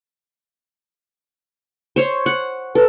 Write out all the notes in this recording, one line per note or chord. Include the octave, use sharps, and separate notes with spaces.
C5 C#5
F#5
A4 B4